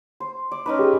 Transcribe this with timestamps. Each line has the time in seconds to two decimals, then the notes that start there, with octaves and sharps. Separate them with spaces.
0.20 C5
0.51 D5
0.66 C#4 D#4 B4
0.79 G4 G#4